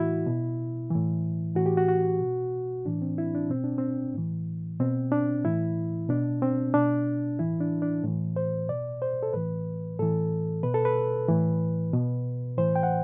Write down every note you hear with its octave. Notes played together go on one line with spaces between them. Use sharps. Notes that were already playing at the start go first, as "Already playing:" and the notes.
Already playing: A2 E3 E4 F#4
B2
E3
A2
A2 E3 F#4
G4
F#4
F#4
B2
A2 E3 D4
C4
E4
D4
B2 C4
D4
C4
A2 E3
B2 C4
D4
A2 E3 E4
B2 D4
C4
B2 D4
A2 E3 E4
D4
D4
A2 E3
C5
B2 D5
C5
A4
A2 E3 B4
A2 E3 A4
B2 B4
A4
B4
A2 E3
B2
A2 E3 C5
G5
F#5